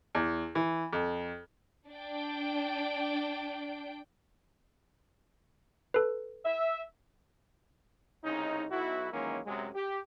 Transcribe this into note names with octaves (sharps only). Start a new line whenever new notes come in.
E2
E3
F2
D4 G5
A4 B4
E5
C2 C#3 C#4 D#4
B1 E4 F#4
D#3 E3 F#3 G#3 A#3 C#4
F#2 C3 F#3 G#3
G4